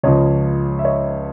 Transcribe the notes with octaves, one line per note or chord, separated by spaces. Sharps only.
C#2 C#3 F3 C#5 D#5
E5
C#5 D#5